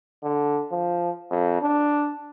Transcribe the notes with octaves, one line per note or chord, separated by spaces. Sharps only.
D3
F3
F2
D4